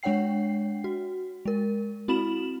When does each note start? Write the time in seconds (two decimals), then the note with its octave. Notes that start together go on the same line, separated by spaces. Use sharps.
0.03 G#3 D4 C#5 F#5 G5 C7
0.84 F#4
1.45 G#3 A#4
2.08 C4 E4 F#4 B5 E7 F#7